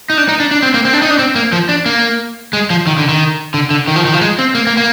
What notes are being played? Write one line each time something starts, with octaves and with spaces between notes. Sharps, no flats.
D#4
D4
D#4
D4
D4
C4
A#3
C4
D4
D#4
D4
C4
A#3
F3
D4
A#3
G#3
F3
D#3
D3
D#3
D3
D3
D#3
F3
D#3
F3
G#3
C4
A#3
A#3
A#3